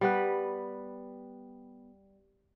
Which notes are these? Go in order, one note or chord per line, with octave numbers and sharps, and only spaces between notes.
G3 B3 B4